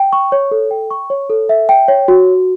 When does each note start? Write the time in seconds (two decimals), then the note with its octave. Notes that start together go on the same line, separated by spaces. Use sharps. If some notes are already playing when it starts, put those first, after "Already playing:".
Already playing: G5
0.13 C#6
0.32 C#5
0.51 A4
0.71 G5
0.91 C#6
1.10 C#5
1.30 A4
1.49 E5
1.69 G5
1.88 C#5
2.08 F#4